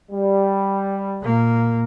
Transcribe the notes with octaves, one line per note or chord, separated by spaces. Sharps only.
G3
A#2 A#3